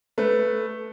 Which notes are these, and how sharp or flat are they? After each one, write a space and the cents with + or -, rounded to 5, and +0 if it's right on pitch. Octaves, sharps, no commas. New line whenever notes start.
A3 +0 B4 +0